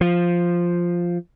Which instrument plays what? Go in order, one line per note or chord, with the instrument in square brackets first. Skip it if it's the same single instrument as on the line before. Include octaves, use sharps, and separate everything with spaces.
[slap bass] F3